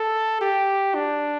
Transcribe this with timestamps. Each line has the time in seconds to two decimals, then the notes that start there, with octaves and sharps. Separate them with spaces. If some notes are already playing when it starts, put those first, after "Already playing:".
Already playing: A4
0.41 G4
0.95 D4